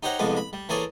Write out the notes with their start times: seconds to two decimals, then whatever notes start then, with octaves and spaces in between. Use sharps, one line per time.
0.03 D#4 G4 C5 C#5 F#5 A#5
0.19 C2 F2 G#3 B3 A4 D6
0.37 B5
0.53 G3
0.69 E3 A#3 G#4 A4 C#5 D5